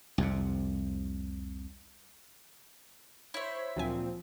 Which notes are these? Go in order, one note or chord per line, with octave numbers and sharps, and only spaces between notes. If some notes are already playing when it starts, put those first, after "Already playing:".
C2 F2 C3
E4 C5 C#5 E5
D2 A#2 F3 F#3 C4 G#5